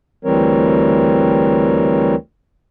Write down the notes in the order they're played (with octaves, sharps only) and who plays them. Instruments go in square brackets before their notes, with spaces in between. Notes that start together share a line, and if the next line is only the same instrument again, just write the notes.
[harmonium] D2 E3 G3 C4 A#4 C#5